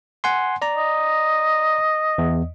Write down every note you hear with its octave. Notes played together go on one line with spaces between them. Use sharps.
F#5 G#5 C6
D5 A#5
D#5
E2